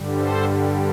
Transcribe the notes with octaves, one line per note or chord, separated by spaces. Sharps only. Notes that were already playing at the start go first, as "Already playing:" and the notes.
Already playing: G2 D3 G3
A4 C5